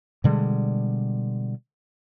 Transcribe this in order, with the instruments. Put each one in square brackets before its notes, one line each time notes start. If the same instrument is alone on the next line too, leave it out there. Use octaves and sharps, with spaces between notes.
[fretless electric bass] B2 D3 G3 G#3